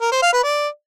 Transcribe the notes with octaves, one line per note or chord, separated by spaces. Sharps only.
A#4
C5
F5
B4
D5